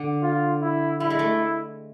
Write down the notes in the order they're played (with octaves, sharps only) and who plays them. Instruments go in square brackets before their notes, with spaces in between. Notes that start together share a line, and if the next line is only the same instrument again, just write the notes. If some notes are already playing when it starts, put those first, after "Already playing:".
Already playing: [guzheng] D3
[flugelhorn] F4
E4
[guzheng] G3 [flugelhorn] E4
[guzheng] G#3
A3